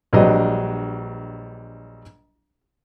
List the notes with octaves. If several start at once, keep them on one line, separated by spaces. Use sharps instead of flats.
A#1 F#3 G3 D4 B4 D#5